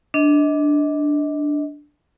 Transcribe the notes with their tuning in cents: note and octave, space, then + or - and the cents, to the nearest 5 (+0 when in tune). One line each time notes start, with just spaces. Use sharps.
D4 +0 D#5 +25